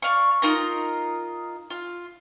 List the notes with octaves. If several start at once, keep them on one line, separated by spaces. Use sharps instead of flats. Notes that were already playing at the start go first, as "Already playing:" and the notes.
D5 F5 C#6
D#4 F4 A#4 A#5
F4